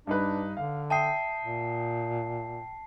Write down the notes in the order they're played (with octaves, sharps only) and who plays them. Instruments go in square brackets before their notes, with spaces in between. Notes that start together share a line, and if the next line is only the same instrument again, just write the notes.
[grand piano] G2 D#4 B4 [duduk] D4
[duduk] D3 [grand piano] F5
[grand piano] E5 G5 D#6 [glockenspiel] A5 C7
[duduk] A#2